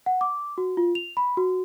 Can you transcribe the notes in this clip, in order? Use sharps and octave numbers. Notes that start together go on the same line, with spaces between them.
F#5
D6
F#4
F4
F7
B5
F#4